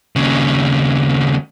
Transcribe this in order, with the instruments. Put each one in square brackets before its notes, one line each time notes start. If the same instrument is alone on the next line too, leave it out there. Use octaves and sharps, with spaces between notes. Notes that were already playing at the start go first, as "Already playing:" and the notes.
[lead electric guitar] D#2 C#3